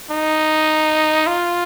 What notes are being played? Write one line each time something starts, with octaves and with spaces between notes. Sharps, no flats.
D#4
F4